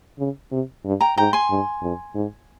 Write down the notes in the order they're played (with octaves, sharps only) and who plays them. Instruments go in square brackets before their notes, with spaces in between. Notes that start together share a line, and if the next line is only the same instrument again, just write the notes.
[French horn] C#3
C3
G2
[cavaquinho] G5 A#5
[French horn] G#2 [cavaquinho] G5 A#5
[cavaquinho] G#5 C6
[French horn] G2
F2
G#2